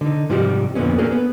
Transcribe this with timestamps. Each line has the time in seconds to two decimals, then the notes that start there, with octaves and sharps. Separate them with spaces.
0.01 D3 D#4
0.29 G#2 C3 F3 G3 F#4 G4
0.75 F2 A#2 D3 B3 C#4
0.98 A3 A#3 C#4 D4 G#4
1.12 B3